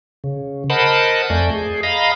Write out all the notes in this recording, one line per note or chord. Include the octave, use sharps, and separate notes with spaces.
C#3
A#4 C5 D#5 F#5 A5 B5
F2 A3 D5 G#5 G6
G#4
D#5 F5 A#5 B5